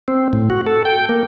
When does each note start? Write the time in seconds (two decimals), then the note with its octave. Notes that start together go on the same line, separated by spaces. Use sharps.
0.08 C4
0.33 A2
0.50 F#4
0.67 A4
0.85 G5
1.09 A#3